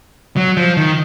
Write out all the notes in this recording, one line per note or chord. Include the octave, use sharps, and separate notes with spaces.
F#3
F3
D#3